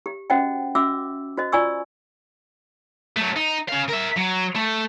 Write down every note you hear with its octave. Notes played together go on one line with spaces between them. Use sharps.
G4
C#4 F#4 C5 D#5 F#5 G5
C#4 F#4 E5 D6 E6
F#4 C5 D#5
F4 D5 G#5 C#6 E6
F#3 A3
D#4
C#3 F5
A#4 E5
F#3
A3